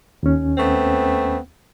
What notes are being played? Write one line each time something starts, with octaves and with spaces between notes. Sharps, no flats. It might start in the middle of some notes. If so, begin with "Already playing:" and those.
D#2 C#4
A3 B3 C4